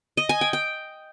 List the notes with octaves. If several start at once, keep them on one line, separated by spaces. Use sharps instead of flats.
D#5
G#5
G5
G5